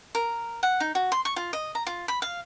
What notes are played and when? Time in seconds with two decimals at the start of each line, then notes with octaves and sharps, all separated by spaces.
0.15 A#4
0.63 F#5
0.80 D#4
0.95 F#4
1.12 C6
1.25 C#6
1.36 F4
1.53 D#5
1.75 A#5
1.87 F4
2.08 B5
2.22 F5